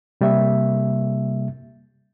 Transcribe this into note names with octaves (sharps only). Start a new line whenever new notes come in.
C3 G3 A#3 E5